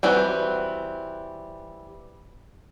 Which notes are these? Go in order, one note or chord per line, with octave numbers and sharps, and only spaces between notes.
E3 G3 C4 F#4